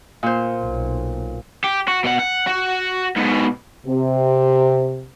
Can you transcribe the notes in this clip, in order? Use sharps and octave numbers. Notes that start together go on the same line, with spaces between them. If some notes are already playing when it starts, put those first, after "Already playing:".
A#2 C5
B1
G4
F#4
B2 F#5
F#5
F#4
G#2 B2
C3